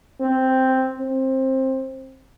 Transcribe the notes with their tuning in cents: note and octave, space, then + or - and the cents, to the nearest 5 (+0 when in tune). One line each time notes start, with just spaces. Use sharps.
C4 +0
C4 +15